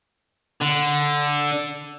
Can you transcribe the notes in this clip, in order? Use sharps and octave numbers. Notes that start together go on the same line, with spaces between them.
D3